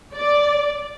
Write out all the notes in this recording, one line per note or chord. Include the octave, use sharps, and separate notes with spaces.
D5